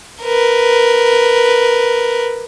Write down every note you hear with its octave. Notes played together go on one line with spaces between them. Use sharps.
A#4 B4